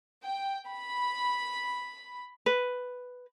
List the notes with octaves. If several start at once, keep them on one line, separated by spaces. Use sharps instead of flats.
G5
B5
B4